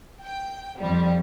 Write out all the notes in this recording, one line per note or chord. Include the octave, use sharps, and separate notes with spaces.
G5
F2 G3